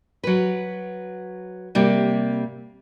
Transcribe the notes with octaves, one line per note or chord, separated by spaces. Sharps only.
F#3 B4
C3 G3 A#3